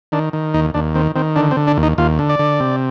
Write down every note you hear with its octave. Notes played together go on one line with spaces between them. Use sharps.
D#3 D4
D#3
D#2 D#4
D#2 D4
D#3 C4
D#3 C4
D3 D4
C4
D3
D4
D#2
D#4
D#2 F4
D3
D5
D3
C3